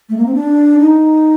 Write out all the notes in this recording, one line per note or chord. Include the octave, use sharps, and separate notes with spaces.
A3
A#3
C4
D4
D#4